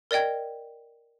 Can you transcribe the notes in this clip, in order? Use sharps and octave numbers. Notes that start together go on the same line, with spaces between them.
A#4 D5 D#5 G5 G#6